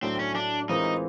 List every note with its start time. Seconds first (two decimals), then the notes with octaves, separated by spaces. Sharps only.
0.02 A2 F#3 A3 C4 D4
0.19 C#4
0.35 D4
0.69 E3 G#3 C4 D#4 F4 A#4